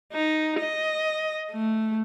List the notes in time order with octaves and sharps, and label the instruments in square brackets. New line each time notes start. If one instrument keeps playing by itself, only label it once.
[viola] D#4
D#5
A3